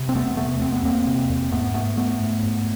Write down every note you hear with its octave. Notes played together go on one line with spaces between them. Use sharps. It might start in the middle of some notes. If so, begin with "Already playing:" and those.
Already playing: C3
C4
E2 A3 B3
C3 A3 B3
E2 C4
B3
E2 A#3 C4
C3
E2
G#2 A3 B3
G#2 A3 B3
G#2 A3 B3
G#2
G#2